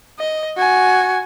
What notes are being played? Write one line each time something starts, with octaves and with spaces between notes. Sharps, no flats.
D#5
F#4 G#5